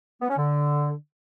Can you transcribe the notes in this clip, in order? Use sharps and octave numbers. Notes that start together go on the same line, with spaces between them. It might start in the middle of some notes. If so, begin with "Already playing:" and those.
B3
C#4
D3